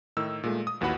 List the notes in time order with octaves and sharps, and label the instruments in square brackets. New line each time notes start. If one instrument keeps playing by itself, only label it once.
[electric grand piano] A2 D#3 D#4 E6
A#2 G#3 A3
D#6
A1 D#2 E3 F#4 F#5 B5